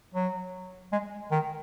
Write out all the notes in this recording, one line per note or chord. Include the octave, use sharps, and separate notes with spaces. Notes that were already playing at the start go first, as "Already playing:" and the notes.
F#3
G#3
D#3